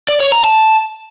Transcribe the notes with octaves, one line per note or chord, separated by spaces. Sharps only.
D5
C#5
A#5
A5